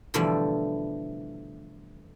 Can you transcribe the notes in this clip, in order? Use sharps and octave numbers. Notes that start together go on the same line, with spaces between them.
B2 D3 E3 F3 G3 A3